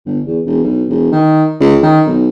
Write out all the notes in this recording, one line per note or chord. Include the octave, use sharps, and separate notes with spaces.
G1
E2
E1
B1
E1
D#3
C#2
D#3
B1